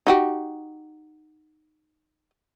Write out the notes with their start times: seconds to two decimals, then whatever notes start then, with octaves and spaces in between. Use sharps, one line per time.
0.07 D#4 F#4 G4